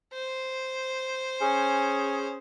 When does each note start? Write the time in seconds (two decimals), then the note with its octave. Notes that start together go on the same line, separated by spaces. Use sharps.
0.13 C5
1.40 C#4 G#4